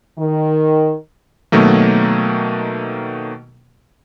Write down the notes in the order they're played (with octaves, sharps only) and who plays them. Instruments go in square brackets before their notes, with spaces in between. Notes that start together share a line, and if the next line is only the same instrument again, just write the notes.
[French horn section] D#3
[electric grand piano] B2 D#3 F#3 A3 A#3